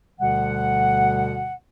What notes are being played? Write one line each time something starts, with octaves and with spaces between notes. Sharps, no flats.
D2 B2 D3 G3 F#5